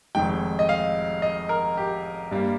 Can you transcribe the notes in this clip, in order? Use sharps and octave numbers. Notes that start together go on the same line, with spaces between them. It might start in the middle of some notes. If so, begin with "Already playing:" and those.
F1 F2 D#3 G#3 G5
D#5
F5
D#5
A#4
G4
G2 G3 A#3